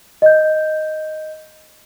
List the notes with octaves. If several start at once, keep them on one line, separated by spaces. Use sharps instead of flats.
D#5 G6